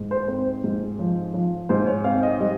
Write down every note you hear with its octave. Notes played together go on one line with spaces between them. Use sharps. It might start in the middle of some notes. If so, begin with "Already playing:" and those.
Already playing: G#2
C5
C4 C5
G#2
F3
F3
G#2 C5
C#5
C4 F5
D#5
G3 D#5